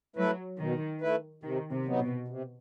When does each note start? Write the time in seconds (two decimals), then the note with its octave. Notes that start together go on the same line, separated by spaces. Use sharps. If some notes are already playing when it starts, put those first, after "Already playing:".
0.16 F#3 A3 E4 B4
0.59 B2 D#3
1.01 A3 E4 B4
1.43 C3 D#3
1.71 C3
1.86 F#3 B3 D#4
2.00 B2
2.28 C3